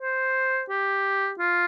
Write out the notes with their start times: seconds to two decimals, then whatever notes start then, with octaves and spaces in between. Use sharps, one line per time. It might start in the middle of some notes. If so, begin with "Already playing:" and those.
0.01 C5
0.69 G4
1.39 F4